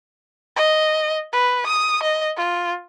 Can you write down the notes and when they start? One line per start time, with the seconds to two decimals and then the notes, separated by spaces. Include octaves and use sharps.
0.56 D#5
1.32 B4
1.66 D#6
2.03 D#5
2.37 F4